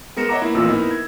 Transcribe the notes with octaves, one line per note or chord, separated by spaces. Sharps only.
G#3 B3 A#4 A#6 C#7 E7
C#5 D#5 E5 F#5 A#5 D6
A#3 B3 E4
A1 F2 A#2 A#3 F4 E6
B3 D#4 E4 A#4
G#6